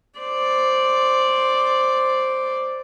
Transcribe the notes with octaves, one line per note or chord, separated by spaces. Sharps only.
C5 D5